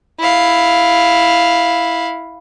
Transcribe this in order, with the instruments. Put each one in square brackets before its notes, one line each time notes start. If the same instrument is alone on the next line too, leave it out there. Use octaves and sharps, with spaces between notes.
[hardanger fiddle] E4 F5